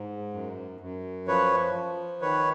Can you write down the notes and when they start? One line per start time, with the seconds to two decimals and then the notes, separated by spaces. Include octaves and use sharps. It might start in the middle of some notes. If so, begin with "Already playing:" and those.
Already playing: G#2
0.34 F#2
0.80 F#2
1.27 F3 B4 C#5
1.74 F3
2.21 D#3 B4 C#5